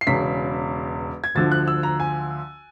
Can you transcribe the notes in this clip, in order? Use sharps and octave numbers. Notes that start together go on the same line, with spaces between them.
C7
E1 E2 C#3 B6
G#6
D2 D3 F3 A6
F#6
E6
A#5
G#5